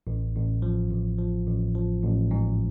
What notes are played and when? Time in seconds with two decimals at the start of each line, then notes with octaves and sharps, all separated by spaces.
0.07 A1
0.35 A1
0.62 F3
0.90 A1
1.18 F3
1.47 A1
1.75 F3
2.03 A1
2.31 G#2